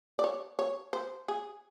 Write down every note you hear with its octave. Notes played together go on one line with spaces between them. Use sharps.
D5
C#5
C#5
C5
G#4